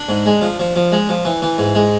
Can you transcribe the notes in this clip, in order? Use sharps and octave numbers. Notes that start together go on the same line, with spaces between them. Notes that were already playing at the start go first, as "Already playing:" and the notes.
Already playing: D4
G#2
G#3
F3
F3
F3
G#3
F3
E3
E3
G#2
G#3